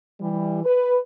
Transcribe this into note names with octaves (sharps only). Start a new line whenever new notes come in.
E3 G3
B4